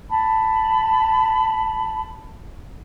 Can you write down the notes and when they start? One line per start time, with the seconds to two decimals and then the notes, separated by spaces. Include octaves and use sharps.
0.09 A5 B5